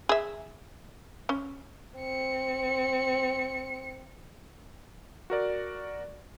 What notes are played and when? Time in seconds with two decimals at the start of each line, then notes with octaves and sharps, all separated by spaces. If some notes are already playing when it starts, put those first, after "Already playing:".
0.09 G#4 E5
1.29 C#4
1.98 C4 C#7
5.30 F#4 A#4 D5